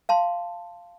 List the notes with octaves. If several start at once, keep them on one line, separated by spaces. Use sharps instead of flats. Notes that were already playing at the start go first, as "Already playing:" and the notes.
F5 A5 C6